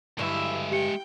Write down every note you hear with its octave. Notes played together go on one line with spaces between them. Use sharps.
G2 D3 F#3 G#3 E4 G4 E5
G4 G5 C#7